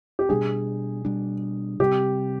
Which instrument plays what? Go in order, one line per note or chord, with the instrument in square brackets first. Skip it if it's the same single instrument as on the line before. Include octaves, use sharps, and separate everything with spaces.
[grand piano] G4
[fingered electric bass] B2 G3 D4 [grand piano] G#4
[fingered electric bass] B2 G3 D4
[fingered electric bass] C3 G3 C4 [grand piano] G4